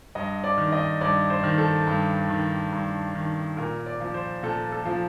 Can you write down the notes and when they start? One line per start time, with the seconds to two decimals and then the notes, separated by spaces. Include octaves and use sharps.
0.15 G2 D#5
0.44 D5
0.58 D#3
0.72 D#5
1.01 G2 D5
1.30 C5
1.43 D#3
1.58 A4
1.87 G2
2.29 D#3
2.72 G2
3.15 D#3
3.57 A#2 A#4
3.86 D5
4.00 F3
4.14 C5
4.43 A#2 A4
4.72 A4
4.85 F3